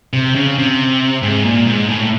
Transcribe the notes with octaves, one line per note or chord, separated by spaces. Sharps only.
C3
C#3
C3
G#2
A#2
G#2
A2